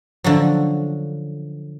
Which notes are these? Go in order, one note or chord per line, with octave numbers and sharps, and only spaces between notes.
D3 F3 F#3